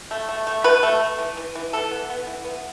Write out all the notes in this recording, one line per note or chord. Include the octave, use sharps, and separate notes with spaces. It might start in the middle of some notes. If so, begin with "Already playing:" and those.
A3
A3
A3
B2 B4
A3
A3
E3
E3
E3
E3 A4
B3
B3
E3
B3